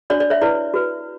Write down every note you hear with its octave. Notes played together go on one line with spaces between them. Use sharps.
D4 F#4 C#5 D5
D5
C#5 E5
E4 B4 D5
F#4 B4